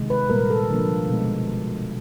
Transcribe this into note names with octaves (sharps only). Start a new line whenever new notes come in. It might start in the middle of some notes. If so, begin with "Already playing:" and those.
Already playing: C3 D#3 G#3
B4
A#2 G3 A#3 A#4
A4
D3 F3 A#3
B2 G#3